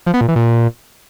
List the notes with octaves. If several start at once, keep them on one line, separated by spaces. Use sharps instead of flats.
F3
B3
A#2
E3
A#2